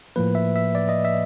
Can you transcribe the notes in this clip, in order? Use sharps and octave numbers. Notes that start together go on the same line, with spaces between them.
A2 F3 A#3 B4
E5
E5
D5
D#5
E5